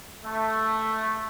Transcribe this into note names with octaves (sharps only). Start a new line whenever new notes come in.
A3